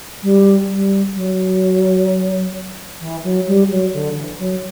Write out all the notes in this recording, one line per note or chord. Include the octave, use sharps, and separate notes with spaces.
G3
G3
F#3
E3
F#3
G3
F#3
D3
E3
F#3